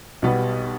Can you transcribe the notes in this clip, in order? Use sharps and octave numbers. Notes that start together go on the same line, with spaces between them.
B1 B2 G3 B3